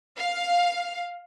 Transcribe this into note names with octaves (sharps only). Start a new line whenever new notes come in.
F5